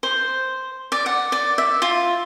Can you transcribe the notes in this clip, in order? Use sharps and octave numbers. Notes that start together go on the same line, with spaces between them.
C5
D5
F#5
D5
E5
F4